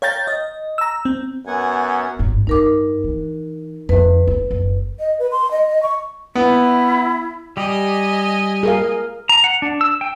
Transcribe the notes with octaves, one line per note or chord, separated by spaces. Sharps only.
C#5 F5 G5 A#5 G6 A6
D#5
A#5 E6
C4
F#2 B3 F#5 G#5
G#1 G2
G2 D#4 A#4 D6
E3
F2 D3 B4
E4
F#1
D#5
B4
C6
D#5
D#5
C#6
B3 E4
G3 G4 D#5 G#5
G#4 A#4 F5
A#5
F#5
D4
E6
G5